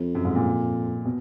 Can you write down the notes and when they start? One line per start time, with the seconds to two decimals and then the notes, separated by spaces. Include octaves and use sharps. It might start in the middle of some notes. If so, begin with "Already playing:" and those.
Already playing: F2
0.15 F#2
0.25 G#2
0.35 A#2
1.05 B2